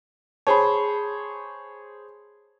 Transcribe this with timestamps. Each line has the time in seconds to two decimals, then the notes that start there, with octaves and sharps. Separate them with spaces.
0.47 G#4 C5 C#5 A5 B5